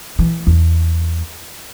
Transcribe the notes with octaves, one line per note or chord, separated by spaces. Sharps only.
E3
E2